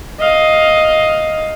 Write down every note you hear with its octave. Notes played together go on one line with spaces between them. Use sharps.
D#5 F5